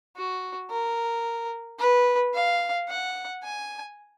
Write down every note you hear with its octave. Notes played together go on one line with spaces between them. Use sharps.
F#4
A#4
B4
F5
F#5
G#5